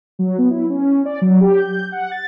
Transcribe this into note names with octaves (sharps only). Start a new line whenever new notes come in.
F#3
B3
E4
C#4
D5
F#3
G4
G6
F#5
A6